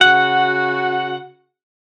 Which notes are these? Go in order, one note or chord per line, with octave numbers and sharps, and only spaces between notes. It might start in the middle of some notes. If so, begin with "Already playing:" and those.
C#3 F#4 F#5